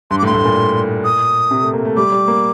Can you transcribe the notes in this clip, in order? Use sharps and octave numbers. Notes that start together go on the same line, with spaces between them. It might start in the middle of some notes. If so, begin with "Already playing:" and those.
G2 C6
D6
A2
C6
A2
A#2
D#6
C3
A3
A#3
A3
G3 D6
G3
A#3